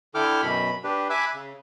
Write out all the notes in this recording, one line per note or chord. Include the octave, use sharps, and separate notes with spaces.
D3 E4 A4 G5 D6 F6
F#2 B2 B5
D4 G4 B4
E5 G#5 B5 D6 E6 F#6
C#3